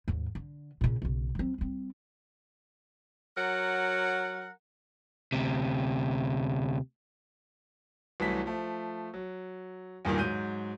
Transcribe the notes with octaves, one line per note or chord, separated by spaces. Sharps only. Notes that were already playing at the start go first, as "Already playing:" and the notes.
D#2 G#2
D3
A#2 C#3
B1 C#3
F#3 C4
G3 C4
F#3 A#4 F#5
D2 C3
C2 E3 F#3 A3 B6
F3 A3
F#3
E2 G2 A#2 D#3
G#2 F#3 G6 D#7